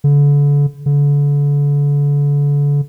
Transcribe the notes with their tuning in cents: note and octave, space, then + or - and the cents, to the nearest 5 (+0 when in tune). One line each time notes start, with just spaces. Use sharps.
D3 -35
D3 -35